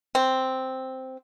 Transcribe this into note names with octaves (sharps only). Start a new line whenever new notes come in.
C4